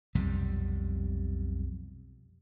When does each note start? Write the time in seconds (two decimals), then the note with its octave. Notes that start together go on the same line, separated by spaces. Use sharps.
0.15 B1 F2 C3 G3